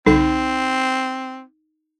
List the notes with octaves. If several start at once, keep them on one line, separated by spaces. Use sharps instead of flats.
C2 D3 C4 D#4